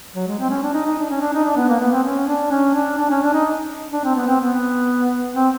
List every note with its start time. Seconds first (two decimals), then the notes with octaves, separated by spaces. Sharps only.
0.16 F#3
0.27 G#3
0.39 C4
0.50 C#4
0.63 D4
0.73 D#4
0.86 D#4
0.98 D4
1.10 C#4
1.21 D4
1.33 D#4
1.44 D4
1.57 B3
1.69 A#3
1.80 B3
1.92 C4
2.04 C#4
2.27 D4
2.51 C#4
2.74 D4
2.98 D4
3.11 C#4
3.22 D4
3.33 D#4
3.92 D4
4.04 C4
4.16 B3
4.27 C4
4.40 B3
5.35 C4